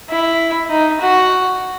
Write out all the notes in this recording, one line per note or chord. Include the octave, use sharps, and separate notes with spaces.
E4
D#4
F#4